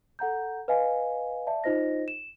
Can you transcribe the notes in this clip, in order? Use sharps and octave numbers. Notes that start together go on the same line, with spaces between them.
A4 F#5 A#5 G6
B4 D#5 F5 G#5
D5 E5 A5
D#4 F4 C5 D#5 A#6
E7